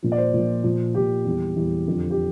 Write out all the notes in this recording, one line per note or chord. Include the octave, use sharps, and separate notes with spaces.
A#2 F3
D5
C5
A#2 F3
A#2 F3
A#2 F3 G4
E2 E3 G3
E2 E3 G3
F2 D3 F3
G4